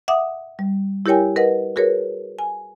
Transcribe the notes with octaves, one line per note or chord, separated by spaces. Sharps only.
E5 F#5 D6 D#6
G3
E4 G4 A#4 C#5 G5 G#5
A#4 B4 D#5 F#5
F#4 G#4 A#4 B4 C#5
G#5